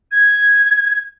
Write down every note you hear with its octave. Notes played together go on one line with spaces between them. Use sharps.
G#6